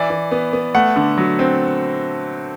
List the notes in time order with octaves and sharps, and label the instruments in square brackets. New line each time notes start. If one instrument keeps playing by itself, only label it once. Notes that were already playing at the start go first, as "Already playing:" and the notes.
Already playing: [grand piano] E3 D5
E3
B3
B3
A3 F#5
D3
F#3
C4